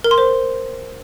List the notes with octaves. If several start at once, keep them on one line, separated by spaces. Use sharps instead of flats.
A#4
C6
C5